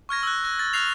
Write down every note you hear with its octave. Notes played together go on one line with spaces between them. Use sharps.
C#6 F6 G#6 A#6
E6 F#6
F#6 A#6
A6
F6 F#6 A#6 C7 F7